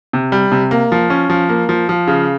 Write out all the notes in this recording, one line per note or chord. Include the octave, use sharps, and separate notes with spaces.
C3
G3
C3
A#3
F3
C#4
F3
A#3
F3
F3
C#3